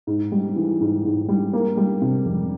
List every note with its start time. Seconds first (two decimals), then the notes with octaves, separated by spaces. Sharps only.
0.07 G#2
0.32 G3
0.56 E3
0.81 G#2
1.05 G#2
1.29 G3
1.53 A#3
1.77 G3
2.02 C3
2.26 F2